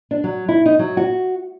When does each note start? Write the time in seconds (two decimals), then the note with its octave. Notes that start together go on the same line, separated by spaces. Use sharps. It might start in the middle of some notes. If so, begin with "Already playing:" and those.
0.11 D4
0.24 F#3
0.49 E4
0.66 D#4
0.79 F#3
0.97 F#4